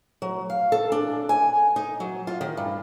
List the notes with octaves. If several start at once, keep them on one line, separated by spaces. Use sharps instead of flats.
F#3
F5
A4
D4
G#5
D#4
F#3
F4
D#3
G2